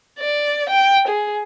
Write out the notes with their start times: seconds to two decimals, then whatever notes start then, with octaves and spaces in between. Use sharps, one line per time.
0.19 D5
0.69 G5
1.08 G#4